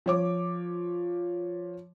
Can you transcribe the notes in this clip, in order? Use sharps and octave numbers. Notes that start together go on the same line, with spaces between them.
F3 C#5 D6